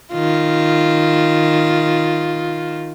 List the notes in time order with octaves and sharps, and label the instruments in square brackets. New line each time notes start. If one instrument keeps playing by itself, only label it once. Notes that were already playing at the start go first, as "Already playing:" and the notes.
[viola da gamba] D#3 F4